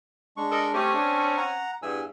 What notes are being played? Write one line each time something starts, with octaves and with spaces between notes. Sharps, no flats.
G#3 D4 C#6
A4 A#4 D#5
A3 C4 C#4 G4
D4
F#5 A#5
E2 G2 G#5 E6